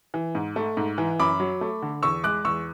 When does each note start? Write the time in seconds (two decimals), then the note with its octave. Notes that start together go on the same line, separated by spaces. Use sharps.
0.14 E3
0.35 G#2
0.56 A3
0.77 G#2
0.98 E3
1.20 F#2 B5 D6
1.40 F#3
1.61 A3
1.82 D3
2.03 E2 C#6 E6
2.24 G#3 D6 F#6
2.45 E2 C#6 E6